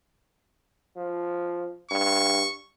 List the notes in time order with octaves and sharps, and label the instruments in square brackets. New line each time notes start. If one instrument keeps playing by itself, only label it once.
[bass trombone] F3
[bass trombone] G2 [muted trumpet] C#6